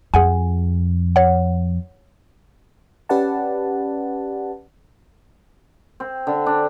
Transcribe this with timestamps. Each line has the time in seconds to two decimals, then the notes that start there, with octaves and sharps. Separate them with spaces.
0.14 F2 G#4 F#5 G#5
1.16 C#5 F#5
3.09 C#4 G4 B4 D5 F#5 A5
6.00 C4
6.27 D3
6.46 D4